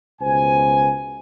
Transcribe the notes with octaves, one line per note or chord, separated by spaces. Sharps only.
C#2 B2 C5 G#5